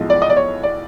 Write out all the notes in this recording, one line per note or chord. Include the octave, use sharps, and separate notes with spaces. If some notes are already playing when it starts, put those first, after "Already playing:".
Already playing: B1 A2 F3 G#3
D5
D#5
D5
C#5
D5